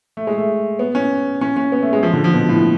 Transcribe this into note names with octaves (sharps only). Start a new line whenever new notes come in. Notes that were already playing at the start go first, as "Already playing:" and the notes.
A3
G#3
A3
B3
C#4
C#4
C#4
B3
A3
G#3
F3
D3
F3
B2
A2